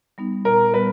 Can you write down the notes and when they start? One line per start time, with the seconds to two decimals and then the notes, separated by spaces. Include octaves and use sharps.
0.18 G3 B3 D#4
0.45 A#2 A#4
0.74 G3 B3 B4